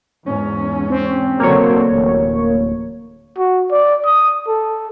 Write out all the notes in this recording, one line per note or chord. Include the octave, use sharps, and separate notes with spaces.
E2 G#2 C#4
C4
B2 D3 F#3 A#3 C#5
D1 A1
F#4
D5
D#6
A4